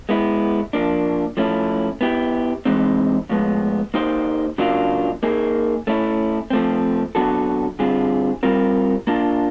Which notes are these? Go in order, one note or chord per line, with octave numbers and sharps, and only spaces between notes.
G#3 B3 E4
F3 A#3 D4
F3 A3 C#4 E4
B3 E4 G4
C3 E3 G#3 C4 D#4
A2 F3 G#3 B3
A#3 D#4 G4 C5
C#3 F#3 A#3 D4 F4
A#3 D#4 G#4
A3 C#4 E4
F3 A3 C4
F#3 B3 D4 F#4 A4
D3 G3 C4 F4 G#4
G3 C4 F4 A#4
A#3 D4 F4